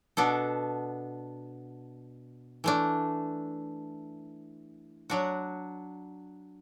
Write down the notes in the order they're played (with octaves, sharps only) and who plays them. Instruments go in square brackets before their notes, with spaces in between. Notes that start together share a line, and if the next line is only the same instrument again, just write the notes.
[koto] B2 B3 D4 A4
E3 A3 D4
F#3 D4 F#4